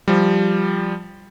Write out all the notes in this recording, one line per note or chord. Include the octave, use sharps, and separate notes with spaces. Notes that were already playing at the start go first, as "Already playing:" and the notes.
F3 G3